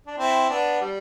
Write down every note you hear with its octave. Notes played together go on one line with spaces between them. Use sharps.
D4
C4 E4
B3 D4
G3